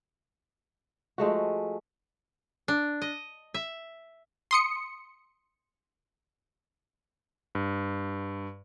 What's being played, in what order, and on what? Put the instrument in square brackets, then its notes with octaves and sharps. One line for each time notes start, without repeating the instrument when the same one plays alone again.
[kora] F3 G#3 A3 F#4
[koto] D4
D#5
E5
[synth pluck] C6 D#6 C#7
[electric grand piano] G2